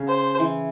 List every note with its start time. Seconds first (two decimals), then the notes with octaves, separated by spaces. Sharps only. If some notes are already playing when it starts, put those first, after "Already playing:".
Already playing: C#3
0.08 C5
0.40 E3